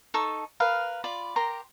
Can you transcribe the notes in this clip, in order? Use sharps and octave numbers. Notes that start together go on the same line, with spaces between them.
D#4 A4 A5 C#6
A#4 B4 F5
F4 D5 B5
G4 A#4 A#5 C6